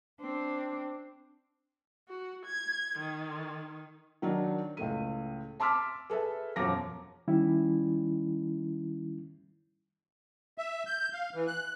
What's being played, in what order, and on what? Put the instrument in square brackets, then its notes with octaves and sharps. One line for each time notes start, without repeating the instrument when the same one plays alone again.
[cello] C4 D4
[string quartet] F#4
G#6
D#3
[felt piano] D#3 F#3 D4 D#4
C#2 A2 A3 D#7
A5 C6 D6 E6 F6 B6
G#4 A4 B4 E5
E1 F#2 F3 D6 A#6
[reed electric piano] D#3 G3 C#4 E4
[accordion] E5
G6
F5
E3
F#6